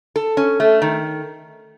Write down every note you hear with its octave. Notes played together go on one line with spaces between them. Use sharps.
A4
C#4
A3
D#3